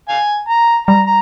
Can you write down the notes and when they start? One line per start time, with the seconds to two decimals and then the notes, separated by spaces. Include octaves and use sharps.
0.09 F5 G#5
0.49 A#5
0.87 G3 A#5
1.07 A#5